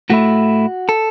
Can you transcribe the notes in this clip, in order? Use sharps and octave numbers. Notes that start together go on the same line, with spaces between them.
A2 A3 E4 F#4
A4